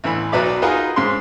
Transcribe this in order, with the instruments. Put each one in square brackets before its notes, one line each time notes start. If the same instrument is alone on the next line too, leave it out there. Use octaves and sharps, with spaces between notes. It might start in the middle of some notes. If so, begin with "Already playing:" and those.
[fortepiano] A1 E3 B5
B1 F#3 B4 D5 B5 D6
D#4 F4 F#4 G#4 A#4 B4
G#2 C#3 C6